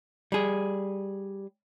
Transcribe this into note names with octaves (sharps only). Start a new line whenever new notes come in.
G3 G#4